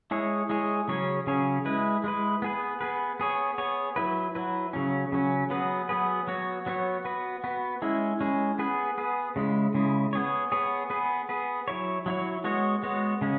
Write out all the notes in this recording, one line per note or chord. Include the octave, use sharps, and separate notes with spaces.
G#3 E4 G#4 C#5
G#3 E4 G#4 C#5
C#3 F#3 C#4 G#4 C#5
C#3 F#3 C#4 G#4 C#5
G#3 E4 B4
G#3 E4 B4
B3 G#4 B4
B3 G#4 B4
B3 G#4 C#5
B3 G#4 C#5
F#3 E4 B4
F#3 E4 B4
C#3 F#3 C#4
C#3 F#3 C#4
F#3 B3 G#4 B4
F#3 B3 G#4 B4
F#3 B3 F#4 C#5
F#3 B3 F#4 C#5
B3 F#4 B4
B3 F#4 B4
G#3 C#4 E4 G#4
G#3 C#4 E4 G#4
B3 G#4 B4
B3 G#4 B4
C#3 G#3 E4
C#3 G#3 E4
B3 G#4 C#5
B3 G#4 C#5
B3 G#4 B4
B3 G#4 B4
F#3 E4 C#5
F#3 E4 C#5
G#3 B3 F#4 C#5
G#3 B3 F#4 C#5
C#3 G#3 C#4